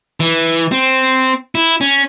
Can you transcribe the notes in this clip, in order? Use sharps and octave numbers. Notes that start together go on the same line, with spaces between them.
E3
C4
E4
C#4